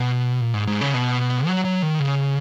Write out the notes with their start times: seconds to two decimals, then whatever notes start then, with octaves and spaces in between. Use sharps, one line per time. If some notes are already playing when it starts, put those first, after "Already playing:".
Already playing: B2
0.41 A#2
0.54 G#2
0.67 G#2
0.81 C#3
0.94 B2
1.47 F#3
1.65 F#3
1.82 D#3
2.00 C#3